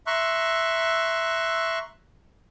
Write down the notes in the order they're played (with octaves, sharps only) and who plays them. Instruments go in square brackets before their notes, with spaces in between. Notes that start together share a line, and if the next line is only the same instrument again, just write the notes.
[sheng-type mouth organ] E5 A#5 C6 C#6 E6 F#6